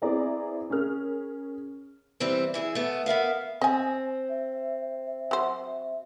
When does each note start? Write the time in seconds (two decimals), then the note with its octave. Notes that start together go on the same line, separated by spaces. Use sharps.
0.02 B3 C4 E4 G#4 D5 A#5
0.70 C#4 G#4 A#4 F6
2.20 E3 G3 C4
2.54 E3 E4 G4 G#4
2.75 A3 B3
3.06 B3 A#4 E5 F5
3.61 C4 D#5 G#5
4.29 E5
5.06 E5
5.31 F#3 C5